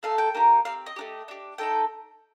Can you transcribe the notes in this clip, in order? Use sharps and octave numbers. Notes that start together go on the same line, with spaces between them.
A3 D#4 A4 F5
G5
A#3 D#4 G4
C4 G4 F5
D#5
A3 D4 G4
D4 G4
A3 D#4 A4 G5